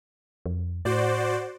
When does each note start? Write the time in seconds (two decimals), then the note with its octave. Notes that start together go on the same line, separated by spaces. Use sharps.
0.46 F2
0.85 A2 F#4 C5 D5